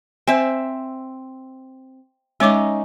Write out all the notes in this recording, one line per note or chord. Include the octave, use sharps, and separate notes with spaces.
C4 C5 E5 G#5
G#3 C#4 D#4 C#5 D6